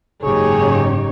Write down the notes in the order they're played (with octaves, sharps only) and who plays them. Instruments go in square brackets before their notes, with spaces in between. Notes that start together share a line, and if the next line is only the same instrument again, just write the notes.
[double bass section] F#1 G#2 C#3 [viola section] D#4 G4 C#5 [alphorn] G#4